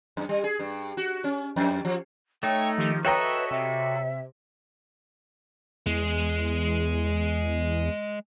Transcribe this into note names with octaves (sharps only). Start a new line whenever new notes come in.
F#2
G3
G#4
G2
F#4
C#4
F2
F3
A3 D#4 C#5 G5
D#3 F3 G4
F#4 A4 B4 C#5 D#5 E5 G5 A#5
C3 E5
E2 G#3